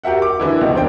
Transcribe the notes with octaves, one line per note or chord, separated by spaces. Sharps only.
F#4 G4 A#4 E5 F#5
D6
D3 E3 E4
C#2 B2
E1 D4 C5 G5